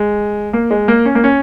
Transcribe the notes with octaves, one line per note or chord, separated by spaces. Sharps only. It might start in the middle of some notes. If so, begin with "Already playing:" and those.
Already playing: G#3
A#3
G#3
A#3
C#4
A#3
C#4